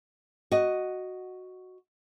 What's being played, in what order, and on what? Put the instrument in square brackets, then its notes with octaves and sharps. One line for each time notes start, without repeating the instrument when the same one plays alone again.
[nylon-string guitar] F#4 D#5